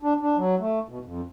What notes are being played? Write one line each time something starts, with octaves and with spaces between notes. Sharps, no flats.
D4
D4
F#3
A3
B2
F2